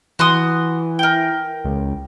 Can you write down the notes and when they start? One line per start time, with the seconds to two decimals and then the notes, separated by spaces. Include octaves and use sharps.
0.19 E3 F#4 C6 D#6
0.99 A#4 G5
1.65 C#2